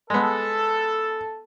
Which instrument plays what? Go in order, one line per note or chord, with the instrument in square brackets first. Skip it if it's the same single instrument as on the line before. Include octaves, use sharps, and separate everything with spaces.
[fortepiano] G#3 B3 [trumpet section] A4